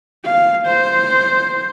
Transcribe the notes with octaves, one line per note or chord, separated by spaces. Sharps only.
F5
C5